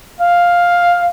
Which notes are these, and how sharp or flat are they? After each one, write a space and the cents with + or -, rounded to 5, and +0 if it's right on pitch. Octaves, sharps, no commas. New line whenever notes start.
F5 +5